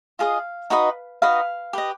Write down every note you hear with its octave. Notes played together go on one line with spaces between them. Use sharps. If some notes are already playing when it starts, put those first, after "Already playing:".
F4 G#4 C5 D#5 F5
D#4 F#4 B4 D#5
D#4 F#4 B4 D#5 F5
G4 B4 D#5